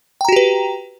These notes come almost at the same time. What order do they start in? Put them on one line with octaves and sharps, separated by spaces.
G5 A#5 F#4 G4 B4